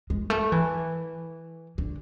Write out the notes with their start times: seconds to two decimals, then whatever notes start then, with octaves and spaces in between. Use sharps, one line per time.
0.10 G#3
0.30 A3
0.52 E3
1.78 D3